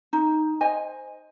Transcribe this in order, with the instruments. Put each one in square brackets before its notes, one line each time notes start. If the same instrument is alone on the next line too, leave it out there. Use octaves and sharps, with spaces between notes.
[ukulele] D#4
C5 D#5 G#5